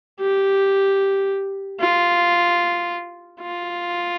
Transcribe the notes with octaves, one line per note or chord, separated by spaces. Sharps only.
G4
F4
F4